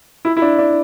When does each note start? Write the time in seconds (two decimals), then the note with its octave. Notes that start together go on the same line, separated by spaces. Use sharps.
0.25 E4
0.37 E4
0.42 D4
0.59 D4